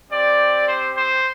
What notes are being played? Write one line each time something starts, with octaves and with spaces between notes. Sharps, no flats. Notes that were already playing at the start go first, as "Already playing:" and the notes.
C4 G4 D5
C5
C5